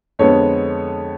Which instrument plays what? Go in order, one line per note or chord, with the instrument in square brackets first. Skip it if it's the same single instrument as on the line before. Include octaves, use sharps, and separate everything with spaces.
[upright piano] F2 D3 G#3 B3 C#5